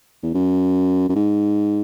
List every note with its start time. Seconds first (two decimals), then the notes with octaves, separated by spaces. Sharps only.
0.23 E2
0.34 F#2
1.09 F#2
1.16 G#2